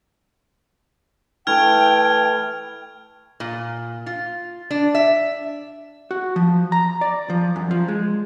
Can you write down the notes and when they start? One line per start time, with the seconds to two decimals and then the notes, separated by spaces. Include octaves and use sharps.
1.47 E3 A3 G5 F6 G#6 F7
3.40 A#2
4.06 F4
4.71 D4
4.95 E5
6.11 F#4
6.36 F3
6.72 A#5
7.01 D5
7.30 F3
7.56 F#2
7.71 F3
7.88 G#3